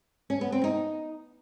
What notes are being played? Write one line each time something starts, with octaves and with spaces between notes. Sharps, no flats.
C#4
B3
C4
D#4